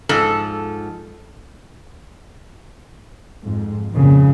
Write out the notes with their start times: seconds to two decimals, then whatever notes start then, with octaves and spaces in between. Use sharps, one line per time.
0.09 G#2 F3 A4
3.44 F2 G#2
3.91 G#1 F2 A#2 C#3